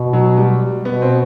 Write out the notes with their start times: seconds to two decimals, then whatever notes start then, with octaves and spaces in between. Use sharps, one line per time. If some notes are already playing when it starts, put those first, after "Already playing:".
Already playing: B2
0.13 F#3
0.37 G3
0.85 B2 B3
1.02 C4